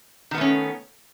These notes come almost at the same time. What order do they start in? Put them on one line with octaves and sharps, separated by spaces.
D#3 B3 A3 C#4